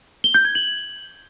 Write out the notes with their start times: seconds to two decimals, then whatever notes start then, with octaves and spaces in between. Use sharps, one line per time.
0.24 G7
0.34 G6
0.45 G#6
0.55 F#7